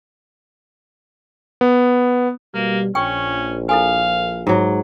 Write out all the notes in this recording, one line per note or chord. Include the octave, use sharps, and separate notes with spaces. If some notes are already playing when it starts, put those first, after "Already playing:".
B3
B2 G3 A#3
A#1 C#4 G5 C#6
E4 A4 F5 G#5
G#2 F#3